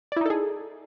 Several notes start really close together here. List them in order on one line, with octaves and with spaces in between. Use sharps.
D5 E4 D#4 A4 G#4